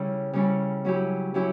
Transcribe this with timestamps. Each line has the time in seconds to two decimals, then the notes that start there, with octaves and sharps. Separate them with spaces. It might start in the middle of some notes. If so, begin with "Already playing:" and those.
Already playing: C#3 G3 C#4 E4
0.33 C#3 G3 C#4 E4
0.85 F#3 C#4 E4 G4
1.34 F#3 C#4 E4 G4